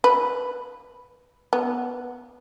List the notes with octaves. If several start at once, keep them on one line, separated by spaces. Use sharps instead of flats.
B4
B3